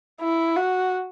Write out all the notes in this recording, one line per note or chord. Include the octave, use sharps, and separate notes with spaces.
E4
F#4